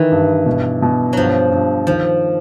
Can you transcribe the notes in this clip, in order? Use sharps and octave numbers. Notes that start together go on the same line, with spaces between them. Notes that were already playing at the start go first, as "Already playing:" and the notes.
Already playing: D#3 E3
G2
B2
B2
G2 F3 F#3
G2
D#3 F3